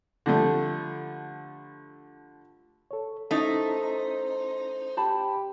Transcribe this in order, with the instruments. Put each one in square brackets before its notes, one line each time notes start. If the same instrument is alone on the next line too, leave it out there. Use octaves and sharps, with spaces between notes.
[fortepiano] D3 F3 G3 A3
[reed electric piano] A4 C#5
[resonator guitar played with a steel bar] A3 D#4 [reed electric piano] C#4 E4 D#5 [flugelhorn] C5
[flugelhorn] G4 [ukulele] C5 A5 B5